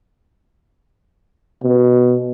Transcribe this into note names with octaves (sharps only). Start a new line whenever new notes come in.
B2